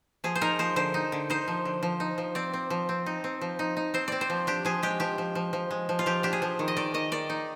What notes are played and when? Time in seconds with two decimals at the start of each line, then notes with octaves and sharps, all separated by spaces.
0.24 F3 G#4
0.35 C5
0.41 D#4 A#4
0.59 F3 C5
0.76 D3 C5
0.94 D#4
1.12 D3
1.30 D#4 C5
1.48 F3
1.65 D3
1.83 F3
2.00 D#4
2.18 F3
2.35 C4 D5
2.54 C4
2.70 F3
2.89 C4
3.06 D#4
3.24 C4
3.41 F3
3.59 D#4
3.77 D#4
3.94 C4 C5
4.08 C4 D5
4.21 C5
4.30 F3
4.47 D4 G4
4.65 F3 G#4
4.83 G#3 G4
5.00 F3 G4
5.18 F3
5.35 F3
5.53 F3
5.71 G#3
5.89 F3
5.99 F4
6.06 F3 G4
6.23 D4 G4
6.33 G#4
6.42 F3
6.59 D#3
6.68 D#5
6.77 D#3 D5
6.94 D#3 D#5
7.12 D#3 D5
7.29 D#4